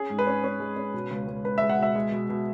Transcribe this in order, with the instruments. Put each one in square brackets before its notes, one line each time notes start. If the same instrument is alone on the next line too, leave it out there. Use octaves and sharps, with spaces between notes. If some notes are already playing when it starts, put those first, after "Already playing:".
Already playing: [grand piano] C#4 G#4
G#2
B4
C#4
C#4
G#3
C#4
B2
C#2
C#2
C#2 B4
G#3 E5
F#5
B2 E5
G#3
B2
B2